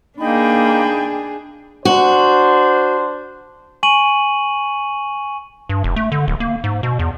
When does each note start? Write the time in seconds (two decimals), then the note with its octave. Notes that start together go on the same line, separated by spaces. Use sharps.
0.18 A#3 D4 D#4 G#4 G5 B5
1.85 D4 F#4 C5
3.83 G#5 C#6 D#7 F#7
5.69 G2
5.84 F1
5.96 A3
6.12 D3
6.28 D1
6.40 A#3
6.64 G#2
6.83 B2
6.99 E2